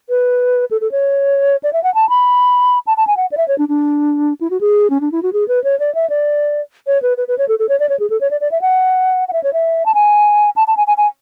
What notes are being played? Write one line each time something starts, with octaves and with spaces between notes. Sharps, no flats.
B4
A4
A4
C#5
D5
E5
F#5
A5
B5
A5
A5
G#5
F#5
D5
E5
C#5
D4
D4
E4
F#4
G#4
C#4
D4
E4
F#4
G#4
B4
C#5
D5
E5
D5
C#5
B4
B4
B4
C#5
A4
A4
C#5
D5
C#5
G#4
A4
C#5
D5
D5
E5
F#5
F#5
E5
C#5
E5
A5
G#5
A5
A5
G#5
G#5
G#5